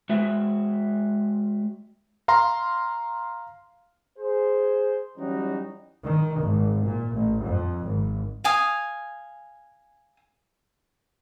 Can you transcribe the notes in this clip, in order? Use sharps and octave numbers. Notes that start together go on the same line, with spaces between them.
G#3 F#4 E5
F5 A#5 C6
G#4 C5
E3 F#3 G3 C#4 D#4 F#4
D#3
G#1
A#2
A1
F2
G#1
F5 G#5 D#6